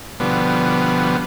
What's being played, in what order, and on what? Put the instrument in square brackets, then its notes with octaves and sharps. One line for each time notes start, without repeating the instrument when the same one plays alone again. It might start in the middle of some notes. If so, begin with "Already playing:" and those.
[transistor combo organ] B2 D3 F3 G3 B3